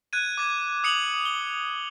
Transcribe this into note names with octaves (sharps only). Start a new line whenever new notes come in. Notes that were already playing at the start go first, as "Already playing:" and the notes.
F#6 G#6 D#7
D6 G#6
D#6 C#7 F7 F#7
G7